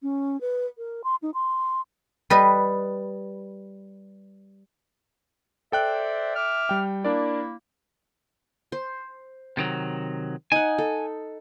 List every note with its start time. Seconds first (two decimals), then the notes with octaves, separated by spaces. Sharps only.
0.02 C#4
0.41 B4
0.78 A#4
1.04 C6
1.22 D#4
1.34 C6
2.30 G3 B4 D#5
5.72 A4 C5 D5 E5 G5 F#6
6.36 E5 D6 F6
6.69 G3 G5
7.05 A#3 D4 E4 A#4 D5
8.72 C5
9.57 C3 D#3 F#3
10.52 D#4 F#5 G#5
10.78 A4